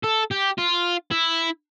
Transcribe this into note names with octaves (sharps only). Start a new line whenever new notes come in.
A4
G4
F4
E4